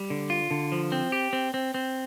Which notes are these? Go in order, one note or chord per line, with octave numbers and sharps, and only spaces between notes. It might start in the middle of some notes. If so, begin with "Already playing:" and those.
Already playing: G3
D3
F4
D3
F3
C4
G4
C4
C4
C4